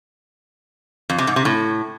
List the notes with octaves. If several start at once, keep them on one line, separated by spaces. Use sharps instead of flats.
F2
C3
G#2
C3
A2